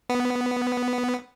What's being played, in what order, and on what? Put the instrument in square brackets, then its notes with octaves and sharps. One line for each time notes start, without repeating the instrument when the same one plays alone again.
[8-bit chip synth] B3